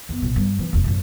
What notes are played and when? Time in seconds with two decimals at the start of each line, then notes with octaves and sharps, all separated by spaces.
0.09 F#2 B3
0.22 B1 A#2
0.36 G2
0.59 E3 F3
0.73 F1 D#2
0.84 F#2 A2